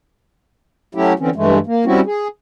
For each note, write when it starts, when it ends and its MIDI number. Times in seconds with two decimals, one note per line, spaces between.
0.95 1.13 54
0.95 1.13 57
0.95 1.13 61
0.95 1.13 64
0.95 1.13 67
1.19 1.30 50
1.19 1.30 52
1.19 1.30 60
1.19 1.30 61
1.36 1.59 43
1.36 1.59 52
1.36 1.59 56
1.36 1.59 57
1.67 1.85 58
1.85 2.01 55
1.85 2.01 60
1.85 2.01 61
1.85 2.01 64
1.85 2.01 66
2.06 2.28 68